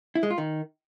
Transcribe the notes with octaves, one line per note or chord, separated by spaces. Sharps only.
E4
G#3
F4
D#3